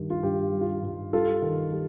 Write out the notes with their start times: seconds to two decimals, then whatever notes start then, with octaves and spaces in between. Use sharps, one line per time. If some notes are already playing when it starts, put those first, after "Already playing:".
Already playing: G2 D#3 G3
0.10 F4
0.23 G2 G4
0.53 G3
0.61 F4
0.68 G4
0.83 G2
1.13 G3 F4 A4
1.42 D#3
1.72 G3